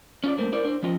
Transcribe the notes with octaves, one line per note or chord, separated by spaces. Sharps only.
C#4 F4 D5
G2 A3 A#3 C5
E4 A#4 C5 D5
D4 C5
F3 C#4 F4 D#5